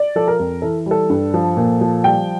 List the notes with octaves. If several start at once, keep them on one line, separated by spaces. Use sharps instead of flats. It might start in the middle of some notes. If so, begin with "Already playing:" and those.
Already playing: D5
F3 A4
A#4
F2
E3 A4
G3
A4
G2
F3
A#2
F3
G3 G5